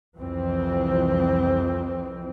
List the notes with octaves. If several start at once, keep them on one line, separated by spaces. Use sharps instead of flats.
C2 F2 E3 C4